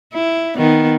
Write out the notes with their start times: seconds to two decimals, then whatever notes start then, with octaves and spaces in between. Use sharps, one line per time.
0.14 E4
0.57 D#3 B3